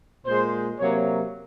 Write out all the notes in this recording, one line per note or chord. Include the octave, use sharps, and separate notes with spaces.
A#2 G#3 C5
C3 F#3 A#3 C#5